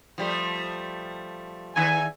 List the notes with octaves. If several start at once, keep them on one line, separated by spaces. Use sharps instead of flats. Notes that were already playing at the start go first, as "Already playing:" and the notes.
F3 G3 A3
E2 D#3 E5 G#5